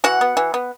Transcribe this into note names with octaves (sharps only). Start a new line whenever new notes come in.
E3 F#4 F#5
B3
E3
B3